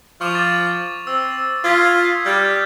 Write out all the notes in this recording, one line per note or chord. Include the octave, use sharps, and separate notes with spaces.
F3 C#6 D6 F7
D6 A6
C4 E6
F4 D#6 G#6 B6
G3 F6 G6 A6